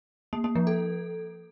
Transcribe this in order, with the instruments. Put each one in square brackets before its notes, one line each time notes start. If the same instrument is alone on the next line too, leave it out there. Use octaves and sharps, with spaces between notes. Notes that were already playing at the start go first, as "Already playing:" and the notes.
[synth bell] A#3
A#3
F3
A4